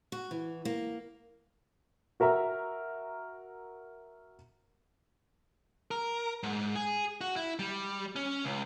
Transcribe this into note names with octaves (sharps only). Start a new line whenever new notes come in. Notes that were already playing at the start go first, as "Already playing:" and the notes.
F#4
E3
A#3
F#4 A#4 E5 A#5
A#4
G#2
G#4
F#4
E4
G3
C#4
C#2